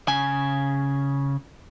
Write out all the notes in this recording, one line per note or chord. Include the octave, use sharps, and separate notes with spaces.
C#3 G#5